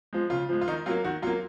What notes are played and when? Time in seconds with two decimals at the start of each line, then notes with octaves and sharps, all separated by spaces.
0.13 F3 G#3
0.30 C#3 F4
0.49 F3 G#3
0.61 F4
0.68 D#3 D#4
0.86 F#3 A#3 F4
1.04 D#3 F#4
1.22 F#3 F4
1.26 A#3